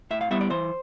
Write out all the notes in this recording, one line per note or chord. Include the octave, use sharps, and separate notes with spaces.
A2 E5
F5
G3 B3 E4 E5
D5
E3 C5